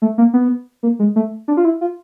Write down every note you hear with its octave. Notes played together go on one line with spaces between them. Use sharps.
A3
A#3
B3
A#3
G#3
A3
D4
F4
E4
F4